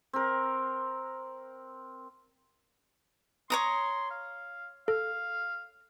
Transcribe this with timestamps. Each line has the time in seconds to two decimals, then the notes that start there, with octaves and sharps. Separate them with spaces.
0.13 C4 A#4
3.50 C#5 A#5 C6 D#6
4.11 F5
4.88 A4 F5